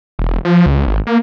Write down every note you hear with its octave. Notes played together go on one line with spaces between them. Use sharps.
E1
F3
C#2
G#1
A#3